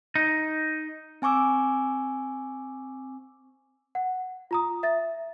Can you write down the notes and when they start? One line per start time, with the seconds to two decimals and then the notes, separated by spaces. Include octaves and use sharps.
0.16 D#4
1.22 C4 G#5 C#6 D6 E6
3.95 F#5
4.51 F4 A#5 D#6
4.83 E5 A6